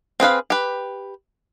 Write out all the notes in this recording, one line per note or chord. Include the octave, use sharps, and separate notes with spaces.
C4 G#4 B4 F5
G4 B4